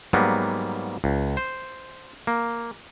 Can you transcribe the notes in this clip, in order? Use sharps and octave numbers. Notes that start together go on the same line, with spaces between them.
G#2 F#3 G3 A#3 B3
C#2
C5
A#3